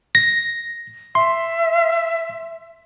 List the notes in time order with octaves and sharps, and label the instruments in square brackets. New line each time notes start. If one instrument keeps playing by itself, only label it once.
[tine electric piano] A#6
[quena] E5 [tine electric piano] C6